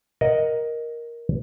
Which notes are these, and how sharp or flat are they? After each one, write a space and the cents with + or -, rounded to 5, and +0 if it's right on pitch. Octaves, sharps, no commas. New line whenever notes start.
A#4 +10 D#5 +0 F#5 +0